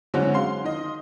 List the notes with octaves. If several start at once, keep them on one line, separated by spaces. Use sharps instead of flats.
D3 F#3 G#3 C4 C#4 F#4
F5 C6
D#3 D#5